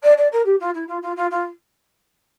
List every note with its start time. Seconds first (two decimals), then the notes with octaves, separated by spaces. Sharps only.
0.03 D5
0.17 D5
0.32 A#4
0.45 G4
0.60 F4
0.74 E4
0.88 F4
1.02 F4
1.16 F4
1.30 F4